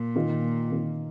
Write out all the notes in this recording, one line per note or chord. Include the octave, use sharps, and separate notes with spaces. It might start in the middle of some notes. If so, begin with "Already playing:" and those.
Already playing: A#2
D#3 A#3 F4
D#3 A#3 F4